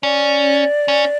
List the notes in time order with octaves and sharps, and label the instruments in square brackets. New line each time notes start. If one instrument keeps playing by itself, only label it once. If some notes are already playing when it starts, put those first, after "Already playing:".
[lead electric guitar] C#4 [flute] D5
[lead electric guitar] C#4